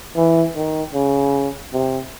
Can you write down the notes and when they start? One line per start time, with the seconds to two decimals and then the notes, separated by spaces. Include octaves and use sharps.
0.16 E3
0.55 D#3
0.94 C#3
1.73 C3